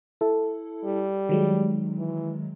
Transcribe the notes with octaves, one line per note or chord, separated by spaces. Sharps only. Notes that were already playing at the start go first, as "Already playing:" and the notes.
E4 A4
G3
D#3 F#3 G#3
E3